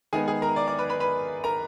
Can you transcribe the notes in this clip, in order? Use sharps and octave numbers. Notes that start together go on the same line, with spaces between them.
D#3 G#3 B3 D#4 G#4 G#5
G#4 G#5
A#4 A#5
D5 D6
D5 D6
B4 B5
B4 B5
B4 B5
A#4 A#5